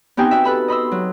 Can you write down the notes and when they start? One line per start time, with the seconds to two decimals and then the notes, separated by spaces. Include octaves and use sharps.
0.17 B3 C4 D#4 G4 G5 G#5
0.31 F#4 E5
0.44 A4 B4 B5 E6
0.68 D#5 B5 C6 E6
0.92 F#3